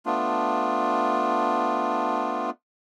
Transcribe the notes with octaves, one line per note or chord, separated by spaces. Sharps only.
A3 B3 D4 F4